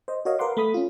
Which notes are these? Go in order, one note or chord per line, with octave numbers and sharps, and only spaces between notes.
C5 D#5
F#4 A#4 C#5 D#5 F5
A#4 B4 F5 F#5 C6 D6
A3 B5 D#6 B6
C#4 F4